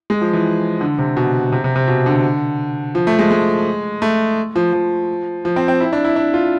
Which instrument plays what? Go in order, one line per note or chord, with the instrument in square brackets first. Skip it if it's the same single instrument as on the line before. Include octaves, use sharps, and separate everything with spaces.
[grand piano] G#3
F3
E3
D3
C3
B2
C3
C3
C3
B2
D3
F3
A3
G#3
G#3
A3
F3
F3
F3
C4
C4
E4
D4
E4
D4
F4